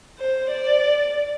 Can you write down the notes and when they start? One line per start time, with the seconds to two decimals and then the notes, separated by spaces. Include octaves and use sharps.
0.19 C5
0.51 D5